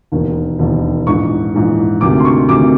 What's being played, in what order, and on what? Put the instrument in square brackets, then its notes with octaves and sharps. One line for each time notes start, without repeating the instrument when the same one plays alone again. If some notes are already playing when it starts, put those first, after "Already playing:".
[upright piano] E1 D#2 D#3
E1 D#2 D#3
A#1 G#2 E3 C#6
A#1 G#2 E3
D2 C3 D#3 D6
C6
C#6
D2 C3 D#3 D6